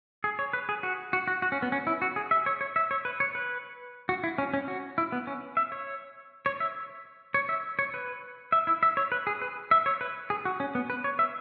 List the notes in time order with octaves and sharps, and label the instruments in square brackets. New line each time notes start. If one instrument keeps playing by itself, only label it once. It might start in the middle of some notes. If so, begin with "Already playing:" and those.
[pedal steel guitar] G#4
C#5
B4
G#4
F#4
F#4
F#4
F#4
C#4
B3
C#4
E4
F#4
G#4
E5
C#5
C#5
E5
C#5
B4
C#5
B4
F#4
E4
C#4
C#4
F#4
E4
B3
C#4
E5
C#5
C#5
E5
C#5
E5
C#5
B4
E5
E4
E5
C#5
B4
G#4
B4
E5
C#5
B4
G#4
F#4
C#4
B3
B4
C#5
E5